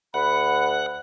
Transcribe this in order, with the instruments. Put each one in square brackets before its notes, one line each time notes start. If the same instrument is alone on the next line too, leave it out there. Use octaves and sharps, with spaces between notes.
[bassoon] D2 [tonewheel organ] F#5 [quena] B5